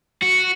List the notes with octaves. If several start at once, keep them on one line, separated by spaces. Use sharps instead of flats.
F#4